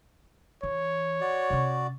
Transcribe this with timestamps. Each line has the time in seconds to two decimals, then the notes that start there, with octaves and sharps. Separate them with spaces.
0.63 E3 C#5
1.21 F#4 D5
1.50 C3 C#4